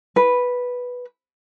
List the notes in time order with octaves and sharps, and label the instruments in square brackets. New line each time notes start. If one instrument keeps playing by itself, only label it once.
[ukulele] B4